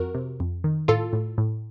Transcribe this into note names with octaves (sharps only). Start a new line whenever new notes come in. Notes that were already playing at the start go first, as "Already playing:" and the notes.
Already playing: F2 F#4 A#4
C3
F2
D#3
A2 F4 A4
A2
A2